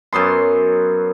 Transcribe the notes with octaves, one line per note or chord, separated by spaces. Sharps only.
F#2 F#3 B3 C6